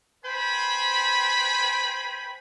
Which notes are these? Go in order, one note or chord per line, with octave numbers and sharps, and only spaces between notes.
B4 C5 G5 G#5 B5